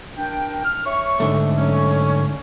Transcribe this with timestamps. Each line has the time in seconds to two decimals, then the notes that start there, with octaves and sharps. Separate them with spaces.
0.17 D4 A#4 G5
0.65 F6
0.86 C#5 E5 C#6
1.20 G#2 D3 A3
1.58 F#3 C#4